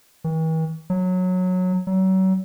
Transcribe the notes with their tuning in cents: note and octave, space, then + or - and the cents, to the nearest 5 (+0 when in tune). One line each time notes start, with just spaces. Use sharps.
E3 -45
F#3 -15
F#3 +35